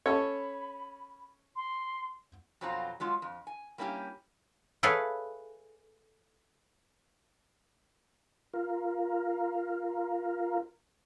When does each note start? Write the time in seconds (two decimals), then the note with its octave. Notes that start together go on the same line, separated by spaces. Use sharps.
0.06 C#4 A4 C#5 B5
1.55 C6
2.61 F2 B2 F#3 C4 F4 A#5
3.00 F#3 G#3 F4
3.22 F2
3.47 G#5
3.78 G3 A#3 C#4 E4 G4
4.83 E4 G#4 A4 B4 C#5 F5
8.54 F4 A#4